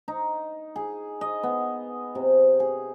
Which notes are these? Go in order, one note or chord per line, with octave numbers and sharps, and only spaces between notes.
D#4
G#4
D#5
B3
C3
G#4